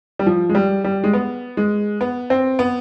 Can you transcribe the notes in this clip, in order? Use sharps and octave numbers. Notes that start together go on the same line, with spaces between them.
G3
F3
G#3
G3
G3
G#3
B3
G#3
B3
C4
B3